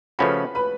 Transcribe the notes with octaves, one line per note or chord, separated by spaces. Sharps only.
C#3 F3 A3 C#4 F#4 B4 B5
B4 B5